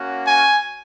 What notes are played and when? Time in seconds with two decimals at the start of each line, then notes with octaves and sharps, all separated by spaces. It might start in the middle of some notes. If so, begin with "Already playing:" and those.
Already playing: A#3 C#4 F#4
0.26 G#5